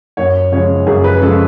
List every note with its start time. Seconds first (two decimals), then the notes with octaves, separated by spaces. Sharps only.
0.17 F#2 C#5
0.52 C#3 F3 G#3 C#5
0.87 F#2 G#4
1.04 B4
1.22 C#3 F3 G#3 A4